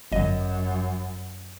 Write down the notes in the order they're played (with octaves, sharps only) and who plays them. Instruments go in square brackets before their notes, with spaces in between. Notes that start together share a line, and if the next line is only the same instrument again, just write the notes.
[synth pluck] G1 D#5 [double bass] F#2